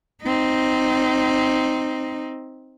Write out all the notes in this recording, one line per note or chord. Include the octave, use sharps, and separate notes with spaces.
C4 D#4